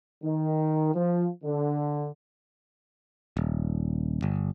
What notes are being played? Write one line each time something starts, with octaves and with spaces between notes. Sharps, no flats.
D#3
F3
D3
D#1
G1